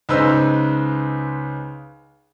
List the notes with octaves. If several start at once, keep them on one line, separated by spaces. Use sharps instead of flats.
C#2 D#4 B4 C5 E6